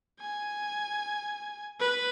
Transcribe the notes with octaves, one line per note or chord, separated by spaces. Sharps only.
G#5
B4